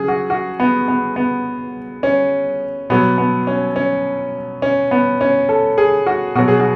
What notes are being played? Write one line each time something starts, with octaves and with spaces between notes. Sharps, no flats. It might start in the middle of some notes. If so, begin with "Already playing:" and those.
Already playing: C#3 F#3 G#4
F#4
F#4
B3
B3
B3
C#4
B2 F#3 B3
B3
C#4
C#4
C#4
B3
C#4
A4
G#4
F#4
B2 F#3 F#4
G#4
F#4